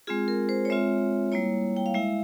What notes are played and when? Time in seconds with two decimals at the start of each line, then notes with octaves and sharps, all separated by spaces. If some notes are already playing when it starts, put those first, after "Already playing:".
0.07 G#3 C4 F4 G#4
0.28 A#4
0.49 C5
0.65 C#5
0.70 G#3 C4 F4 E5
1.32 G3 A#3 E4 C#5
1.77 G5
1.86 F5
1.94 G#3 E4 E5